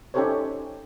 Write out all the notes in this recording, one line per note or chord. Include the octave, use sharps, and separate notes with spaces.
C#4 D#4 G4 A4 C5 C#5